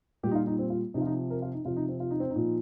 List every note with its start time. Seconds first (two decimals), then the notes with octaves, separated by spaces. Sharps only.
0.23 A#2 G3 G4
0.31 D#4
0.35 F4
0.47 D#4
0.59 C4
0.70 F4
0.94 C3 D#4
0.98 F3 F4
1.06 D#4
1.30 A#4
1.42 F4
1.54 D#4
1.65 C3 F4
1.68 F3
1.77 D#4
1.89 C4
2.00 F4
2.11 D#4
2.20 C4
2.30 D#4
2.36 A#2 F3